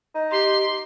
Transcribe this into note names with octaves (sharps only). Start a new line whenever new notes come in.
D#4
G4 C6